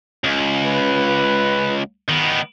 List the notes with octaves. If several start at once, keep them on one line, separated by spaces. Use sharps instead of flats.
C#2
B4
D#3 B3